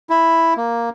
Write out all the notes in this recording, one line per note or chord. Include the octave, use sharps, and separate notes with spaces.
E4
A#3